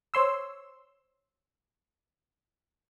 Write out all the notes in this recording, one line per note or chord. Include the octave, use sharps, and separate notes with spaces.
C5 C#5 C6 E6